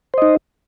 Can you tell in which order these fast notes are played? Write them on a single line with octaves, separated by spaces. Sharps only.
C5 D#5 D#4